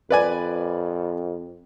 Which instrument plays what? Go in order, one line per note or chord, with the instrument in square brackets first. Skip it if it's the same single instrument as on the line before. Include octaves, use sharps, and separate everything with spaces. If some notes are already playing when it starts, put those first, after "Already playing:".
[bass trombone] F2 [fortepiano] B4 D5 G#5